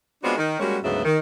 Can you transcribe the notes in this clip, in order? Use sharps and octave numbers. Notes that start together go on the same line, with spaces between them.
G#3 B3 C4 D4 F4 F#4
D#3
G3 G#3 A#3 C#4 F#4
D2 G#2 C#3 F#3 B3 E5
D#3